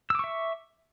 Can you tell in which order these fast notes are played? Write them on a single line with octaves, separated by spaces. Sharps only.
E6 D6 C#6 E5